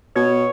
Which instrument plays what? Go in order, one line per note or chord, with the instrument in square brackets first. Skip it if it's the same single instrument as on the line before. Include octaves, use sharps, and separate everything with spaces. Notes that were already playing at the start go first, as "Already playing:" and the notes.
[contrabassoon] B2 [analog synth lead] C#5